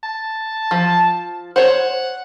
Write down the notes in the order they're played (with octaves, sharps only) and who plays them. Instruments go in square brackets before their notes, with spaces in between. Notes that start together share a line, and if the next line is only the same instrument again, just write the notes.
[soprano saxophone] A5
[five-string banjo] F3
[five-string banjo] C5 C#5 [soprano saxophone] F#5